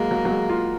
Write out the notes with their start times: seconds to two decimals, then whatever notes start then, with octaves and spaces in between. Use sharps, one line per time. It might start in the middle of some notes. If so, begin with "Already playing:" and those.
Already playing: F#3 G#3 A#3
0.11 F#3
0.25 F#3
0.30 G#3
0.49 F4